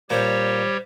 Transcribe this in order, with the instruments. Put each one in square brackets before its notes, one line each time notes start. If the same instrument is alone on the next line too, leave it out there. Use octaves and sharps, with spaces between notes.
[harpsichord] A#2 [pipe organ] G3 G4 C#5 [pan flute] C5